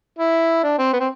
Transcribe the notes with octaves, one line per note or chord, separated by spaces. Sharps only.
E4
D4
C4
B3
C4